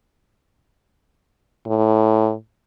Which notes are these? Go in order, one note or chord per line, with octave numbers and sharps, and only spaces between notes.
A2